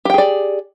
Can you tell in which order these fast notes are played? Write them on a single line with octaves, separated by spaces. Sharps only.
G4 G5 G#4 D5